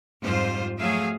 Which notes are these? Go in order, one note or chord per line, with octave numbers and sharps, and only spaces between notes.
F2 G#2 G3 F4 C5
F3 F#3 A3 G#4 E5 F5